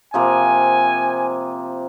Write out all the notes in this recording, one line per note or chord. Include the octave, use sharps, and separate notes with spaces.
C3 F3 A#3 G#5